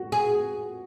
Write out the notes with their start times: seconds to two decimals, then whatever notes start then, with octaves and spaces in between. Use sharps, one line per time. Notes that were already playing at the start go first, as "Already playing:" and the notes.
Already playing: F#4
0.12 G#4